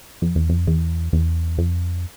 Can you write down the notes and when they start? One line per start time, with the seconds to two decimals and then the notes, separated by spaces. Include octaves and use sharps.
0.22 F2
0.36 E2
0.49 F2
0.67 E2
1.13 E2
1.58 F2